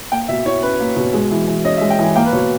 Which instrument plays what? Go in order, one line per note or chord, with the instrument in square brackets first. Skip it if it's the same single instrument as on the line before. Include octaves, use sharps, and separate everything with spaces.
[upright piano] A#3 [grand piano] G5
[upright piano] B2 [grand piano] E5
[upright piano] E4 [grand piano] C#5
[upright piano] C#4 [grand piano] B4
[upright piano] A#3
B2
G#3
E3
E3
[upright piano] C#4 [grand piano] D#5
[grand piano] E5
[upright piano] G#3
[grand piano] G5
[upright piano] E3 [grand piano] G#5
[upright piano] A#3 [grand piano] G5
[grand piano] B4
[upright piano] B2 [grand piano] C#5